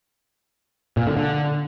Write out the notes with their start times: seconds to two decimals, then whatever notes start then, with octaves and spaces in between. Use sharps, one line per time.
0.97 A#2
1.07 D3
1.17 D3